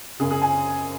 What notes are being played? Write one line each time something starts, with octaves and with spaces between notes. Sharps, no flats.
F#2 C#3 G#4
G#4
G#5